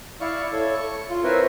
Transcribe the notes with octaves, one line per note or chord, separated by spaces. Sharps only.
E4 D5 F5 C#6
A4 C#5
C#6
F4
C4 E4 A#4 B4 C#5